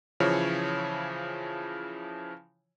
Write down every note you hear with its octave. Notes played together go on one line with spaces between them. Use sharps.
C#3 E3 F3 E4 C#5